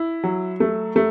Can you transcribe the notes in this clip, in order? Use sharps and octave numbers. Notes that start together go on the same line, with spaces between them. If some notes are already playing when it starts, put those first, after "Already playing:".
Already playing: E4
F#3
A3
A3